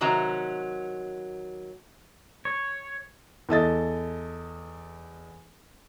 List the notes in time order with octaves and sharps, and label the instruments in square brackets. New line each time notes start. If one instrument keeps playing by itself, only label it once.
[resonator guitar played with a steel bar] C3 D#3 F#3 C#4 A#5
[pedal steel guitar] C#5
[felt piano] E2 A4 D#5 A6